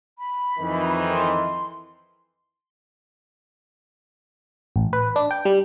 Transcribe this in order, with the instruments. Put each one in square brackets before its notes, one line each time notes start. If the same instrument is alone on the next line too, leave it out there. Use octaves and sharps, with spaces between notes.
[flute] B5
[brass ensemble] F2 D#3 E3
[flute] C6
[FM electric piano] A1
B4
D4
G5
G3